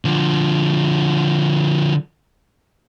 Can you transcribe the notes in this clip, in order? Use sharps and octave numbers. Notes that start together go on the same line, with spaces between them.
D3 F3